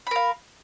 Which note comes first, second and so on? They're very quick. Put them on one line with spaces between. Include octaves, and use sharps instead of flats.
B5 A#4 F5